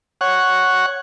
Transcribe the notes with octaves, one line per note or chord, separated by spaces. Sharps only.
C#5 F#5